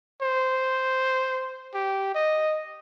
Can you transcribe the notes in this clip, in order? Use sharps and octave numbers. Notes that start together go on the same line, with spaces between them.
C5
G4
D#5